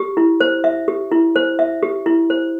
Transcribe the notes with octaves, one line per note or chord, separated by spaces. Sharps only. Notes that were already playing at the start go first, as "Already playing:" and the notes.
Already playing: G4
E4
C5
E5
G4
E4
C5
E5
G4
E4
C5